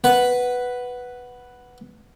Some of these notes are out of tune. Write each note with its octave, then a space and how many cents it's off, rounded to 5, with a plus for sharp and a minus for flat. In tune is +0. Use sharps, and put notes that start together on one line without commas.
B4 +0 F#5 +0 B5 +0